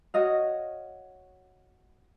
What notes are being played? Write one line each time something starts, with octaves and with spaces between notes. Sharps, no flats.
F#4 C#5 D#5 F5